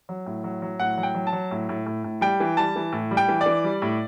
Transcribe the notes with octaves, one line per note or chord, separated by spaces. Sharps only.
F#3
A2
F#3
F#3
A2 F#5
F#3
G5
F#3
A5
F#3
A2
A2
A2
A2
G3 G5
E3
G3 A5
E3
A2
G3
G5
E3
D5
E3
G3
A2